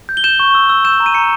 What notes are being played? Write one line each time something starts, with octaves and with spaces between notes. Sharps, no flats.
G6
G7
G6 E7
C#6
E6
E6
G6 E7
A#5
D#7
A#5 C#7